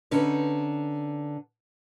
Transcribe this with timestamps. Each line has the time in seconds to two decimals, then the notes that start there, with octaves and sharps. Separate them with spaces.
0.11 D3 C#4 D#4 B4